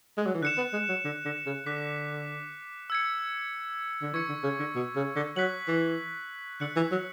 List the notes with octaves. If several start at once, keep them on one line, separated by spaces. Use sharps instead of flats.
G#3
F#3
E3
D3 F#6 C#7 E7
B3
G#3
F#3
D3
D3
C#3
D3 D6 F#6 B6
E6 G#6 C#7
D3
E3 C#6 G#6 C#7
D3
C#3
D3
B2
C#3
D3
F#3 F#6 B6 F#7
E3
D3 F#6 C#7 F#7
E3
F#3